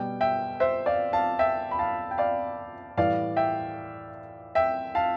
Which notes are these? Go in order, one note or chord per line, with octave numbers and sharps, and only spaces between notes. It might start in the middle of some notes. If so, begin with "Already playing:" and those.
Already playing: B2 G3 G5
E5 G5
C5 E5
D5 F5
F5 A5
E5 G5
B5
F5 A5
G5
D5 F5
A2 E3 G3 D5 F5
E5 G5
E5 G5
F5 A5